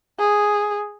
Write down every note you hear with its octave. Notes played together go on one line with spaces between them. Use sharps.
G#4